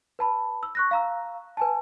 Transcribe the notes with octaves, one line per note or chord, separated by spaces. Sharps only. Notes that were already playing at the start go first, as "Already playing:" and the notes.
B4 A5 B5
E6
C#6 F#6 A#6
F5 A#5 E6
B4 G#5 A5